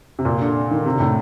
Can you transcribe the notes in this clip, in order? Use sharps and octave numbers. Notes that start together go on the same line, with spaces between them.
C3
A#2
D3
D#3
C3
A2